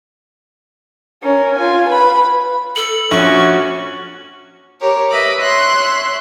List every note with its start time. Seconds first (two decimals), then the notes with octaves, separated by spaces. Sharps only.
1.23 C#4 A#4
1.57 F4 G#5
1.89 B4 B5
2.76 A4 F#7
3.11 A#1 C#4 F#4 C#6
4.81 G4 A#4 C#5
5.10 B4 D#5 E5 B5 D6
5.41 C#5 E5 C6 F#6